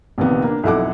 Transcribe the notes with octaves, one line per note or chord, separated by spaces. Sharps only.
A#1 C3 D#3 B3
A#3 D4
B1 F2 E4 A4 F#5 D6